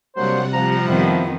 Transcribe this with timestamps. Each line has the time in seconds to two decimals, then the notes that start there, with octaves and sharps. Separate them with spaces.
0.16 C3 F#3 G3 A#3 D4 C5 F#5
0.53 F3 A#5
0.87 F2 D#3 B3 E4